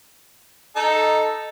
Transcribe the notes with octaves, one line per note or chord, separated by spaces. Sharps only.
D#4 A4